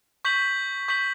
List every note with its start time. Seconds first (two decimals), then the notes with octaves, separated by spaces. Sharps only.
0.25 C#6 G6 B6 F#7
0.88 C#6 G6 B6 F#7